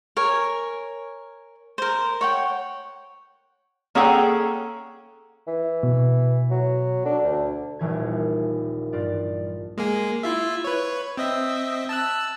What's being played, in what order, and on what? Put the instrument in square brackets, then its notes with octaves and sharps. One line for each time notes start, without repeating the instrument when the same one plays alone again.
[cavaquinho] A#4 C#5 G#5
A#4 C5
C#5 F#5 G5
[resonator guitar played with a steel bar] A#3 C#4 G#4 A4 F#5 G5
[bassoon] E3
[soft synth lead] B2
[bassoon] F#3
[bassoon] D4 [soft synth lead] A4
[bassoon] D2
[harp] D#1 A#1 E3 G#6
G2 F4 D5
[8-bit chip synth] G#3 A#3 G#4
E4 F4 E5
B4 C#5
C4 D#5 E5
A5 E6 F#6